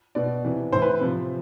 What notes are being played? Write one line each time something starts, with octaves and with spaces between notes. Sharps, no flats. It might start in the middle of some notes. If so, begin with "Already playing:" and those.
B2 D5
C3 E3
A2 E3 C5
B4
C3 F3